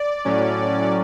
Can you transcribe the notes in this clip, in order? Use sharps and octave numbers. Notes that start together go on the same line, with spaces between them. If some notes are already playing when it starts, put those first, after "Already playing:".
Already playing: D5
A2 F#3 C#4